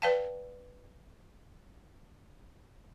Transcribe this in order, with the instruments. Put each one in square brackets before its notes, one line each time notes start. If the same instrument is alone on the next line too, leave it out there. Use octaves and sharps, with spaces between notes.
[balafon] B4 D5 F5 G5 A5